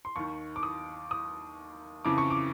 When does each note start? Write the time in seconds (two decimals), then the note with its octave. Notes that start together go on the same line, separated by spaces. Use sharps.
0.05 C6
0.16 D#2 D#3 C#6
0.56 D6
0.63 D#6
1.11 D#6
2.05 F2 C#3 E3 D6
2.18 C#6
2.30 D6